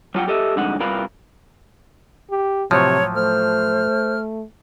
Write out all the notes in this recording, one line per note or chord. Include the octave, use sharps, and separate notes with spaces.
F#3 F4 F#5 G5
G4 A4 D#5 E5
C2 F2 D3 G#3 D#4 F#5
C2 G2 F4 A#4 B4 F5
G4
A2 C3 F3 F#3 C#5
A3 C5 F6